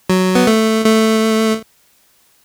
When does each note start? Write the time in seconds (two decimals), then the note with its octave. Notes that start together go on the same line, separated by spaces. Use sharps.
0.10 F#3
0.35 B3
0.47 A3
0.85 A3